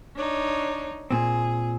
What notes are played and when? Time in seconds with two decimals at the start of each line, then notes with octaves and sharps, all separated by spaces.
0.16 D4 D#4 C#5
1.11 A#2 C4 G#4